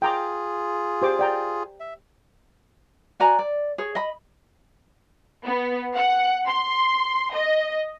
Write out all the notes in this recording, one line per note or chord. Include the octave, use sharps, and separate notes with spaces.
F4 G#4 G5 A#5 D6
G4 C5 D6
D5 G5 A#5
E5
F#4 D5 G#5 A#5
D5
G#4 C#5
D#5 B5
B3
F#5
C6
D#5